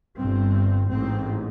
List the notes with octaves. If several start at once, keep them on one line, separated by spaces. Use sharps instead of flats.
G1 G2 C4
A1 G#2 C4